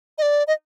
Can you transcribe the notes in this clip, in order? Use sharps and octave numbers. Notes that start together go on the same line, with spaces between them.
D#5
D5
D#5